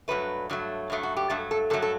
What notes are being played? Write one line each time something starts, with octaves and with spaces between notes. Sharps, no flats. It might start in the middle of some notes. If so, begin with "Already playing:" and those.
G2 F#3 A3 B4
G2 F#3 A3
G2 F#3 A3
F#4
G4
G2 F#3 A3 A4
A4
G2 F#3 A3 A4
A4